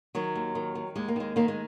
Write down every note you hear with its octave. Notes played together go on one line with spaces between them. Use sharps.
D#3 F#3
D#2
D#3
D#3
D#2 G#3
A#3
D#3 G#3
D#3 A#3
G#3